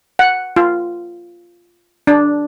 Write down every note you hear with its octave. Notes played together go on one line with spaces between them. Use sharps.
F#5
F4
D4